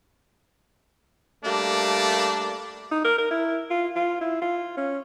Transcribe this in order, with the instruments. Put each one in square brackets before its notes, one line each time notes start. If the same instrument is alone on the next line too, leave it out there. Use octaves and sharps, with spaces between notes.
[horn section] G3 A3 A#3 D4
[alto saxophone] D#4
A#4
A#4
E4
F4
F4
E4
F4
C#4